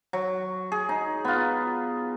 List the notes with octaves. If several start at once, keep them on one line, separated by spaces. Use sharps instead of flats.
F#3
G#4
D#4
B3 F4